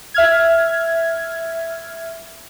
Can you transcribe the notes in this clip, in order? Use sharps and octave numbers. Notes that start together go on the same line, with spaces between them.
E5 F6 G#6